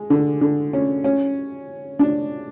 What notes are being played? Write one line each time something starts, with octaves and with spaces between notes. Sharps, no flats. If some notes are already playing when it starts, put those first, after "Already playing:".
Already playing: G#3
D3
D3
C#4
C#4
D4